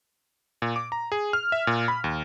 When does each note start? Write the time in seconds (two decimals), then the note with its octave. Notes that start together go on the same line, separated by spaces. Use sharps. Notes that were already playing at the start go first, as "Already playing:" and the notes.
0.62 A#2
0.76 D6
0.92 A#5
1.12 G#4
1.33 F6
1.52 E5
1.67 A#2
1.88 B5
2.04 D#2